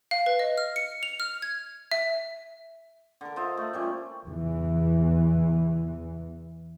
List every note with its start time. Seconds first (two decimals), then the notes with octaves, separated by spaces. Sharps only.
0.11 F5
0.26 B4
0.39 D#5
0.58 F6
0.76 C#7
1.03 F7
1.20 F6
1.42 G#6
1.92 E5
3.21 D3 A#4
3.36 F4 C5 D#5 E5
3.57 A3
3.73 A#2 G3 C#4
4.27 E2 E3